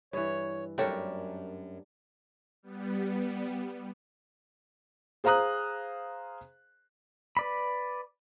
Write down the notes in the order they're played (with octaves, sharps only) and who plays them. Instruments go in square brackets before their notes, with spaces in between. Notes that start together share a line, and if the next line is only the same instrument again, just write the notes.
[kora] G2 E3 [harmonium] C#5
[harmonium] F#2 [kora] G3 D4 A#4 [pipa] A3 C4 C#5
[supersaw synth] G3 B3
[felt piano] G#4 C5 F5 A#5 D#6 F#6
[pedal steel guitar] B4 D5 B5